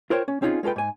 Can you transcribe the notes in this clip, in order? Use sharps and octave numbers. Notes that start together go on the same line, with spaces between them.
F4 A#4 C5 C#5 F#5 G5
C#4
C4 C#4 D#4 F4 G#4
G#3 F4 A4 B4 G5
G#2 G#5